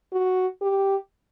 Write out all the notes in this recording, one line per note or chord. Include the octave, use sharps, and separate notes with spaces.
F#4
G4